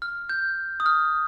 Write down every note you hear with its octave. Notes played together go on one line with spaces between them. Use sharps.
F6
G6
D#6
F6